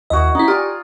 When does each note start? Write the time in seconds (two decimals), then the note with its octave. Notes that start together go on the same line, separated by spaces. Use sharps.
0.10 D#2 E4 F#4 D#5
0.35 C#4 D#4 E4
0.48 F4 G4 D5 G#5